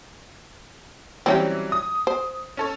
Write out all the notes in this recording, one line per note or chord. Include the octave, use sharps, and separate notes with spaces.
E3 F#3 G3 C4 C#4 G4
D#6
C5
C#4 A4 C#5